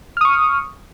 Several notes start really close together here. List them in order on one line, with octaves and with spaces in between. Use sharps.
F6 D#6 C#6